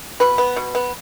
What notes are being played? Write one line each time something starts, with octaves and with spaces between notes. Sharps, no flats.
B2 B4
B3
B2
B3